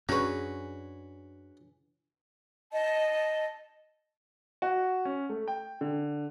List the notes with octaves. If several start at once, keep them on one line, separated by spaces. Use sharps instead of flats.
F#2 C#4 D4 F#4 G#4 B4 C#5 C#6
D#5 A5
F#4
C#4
A3
G5
D3